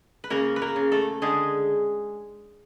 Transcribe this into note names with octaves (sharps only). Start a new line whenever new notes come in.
B4
C#3 A#3 A#4
B4
A#3 A#4
C#3
A3 A4
D3 G#3 G#4